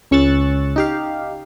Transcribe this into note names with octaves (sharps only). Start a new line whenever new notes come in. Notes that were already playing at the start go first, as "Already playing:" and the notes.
C#2 C#4 C#6 E6 F#6 A6
D#4 G4 F5